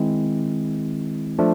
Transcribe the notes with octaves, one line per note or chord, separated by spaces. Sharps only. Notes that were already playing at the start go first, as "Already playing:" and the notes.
Already playing: D#3 G#3 C4 E4
F3 A3 D4